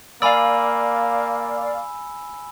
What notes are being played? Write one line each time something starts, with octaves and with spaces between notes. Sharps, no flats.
A#3 D5 F5 G#5 B5 E6